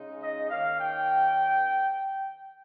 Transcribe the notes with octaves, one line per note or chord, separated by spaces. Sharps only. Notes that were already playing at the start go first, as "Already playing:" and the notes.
Already playing: C#3 G#3 D#4
D#5
D#3 A#3 C#4 F5
G5